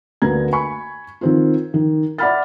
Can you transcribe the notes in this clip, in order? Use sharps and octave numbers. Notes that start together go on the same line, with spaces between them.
D2 D3 A#3 B4 A#5 G#6
G#5 B5 C#6
D#3 C4 F4
D#3
D5 E5 F#5 B5 F6 A6